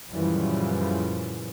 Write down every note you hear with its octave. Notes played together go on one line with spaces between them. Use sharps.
F#2 A#2 C#3 E3 F3 G3